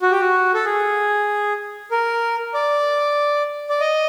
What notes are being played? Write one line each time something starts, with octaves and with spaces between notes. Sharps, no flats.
F#4
G4
F#4
A4
G#4
A#4
D5
D5
D#5